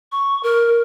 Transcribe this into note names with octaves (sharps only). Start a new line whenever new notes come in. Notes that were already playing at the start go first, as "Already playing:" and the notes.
C#6
A#4